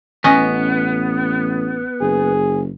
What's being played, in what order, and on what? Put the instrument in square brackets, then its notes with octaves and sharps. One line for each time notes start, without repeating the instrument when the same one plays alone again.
[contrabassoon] A1 [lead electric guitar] B3 [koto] C#4 D#5
[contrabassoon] F#1 [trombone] G#4